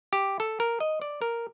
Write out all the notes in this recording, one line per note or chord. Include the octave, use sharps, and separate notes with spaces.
G4
A4
A#4
D#5
D5
A#4